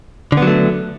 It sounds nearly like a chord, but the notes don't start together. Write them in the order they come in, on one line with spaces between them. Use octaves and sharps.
D3 B3 F#3 A3